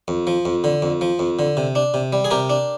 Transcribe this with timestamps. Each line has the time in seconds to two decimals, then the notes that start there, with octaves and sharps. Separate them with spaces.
0.08 F2
0.27 F3
0.45 F2
0.64 D3
0.82 F2
1.01 F3
1.19 F2
1.39 D3
1.57 C3
1.75 D4
1.94 C3
2.13 G3
2.25 G#4
2.31 C3 G4 A#4
2.50 D4